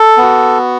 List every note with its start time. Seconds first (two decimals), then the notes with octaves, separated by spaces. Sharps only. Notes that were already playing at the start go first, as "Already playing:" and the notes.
Already playing: A4
0.17 B3 F#4